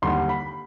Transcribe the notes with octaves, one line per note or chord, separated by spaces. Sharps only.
D#2 D3 G3 C6
B5